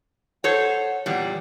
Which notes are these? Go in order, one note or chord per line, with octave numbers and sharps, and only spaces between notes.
A4 C5 C#5 F#5
E2 A#2 G3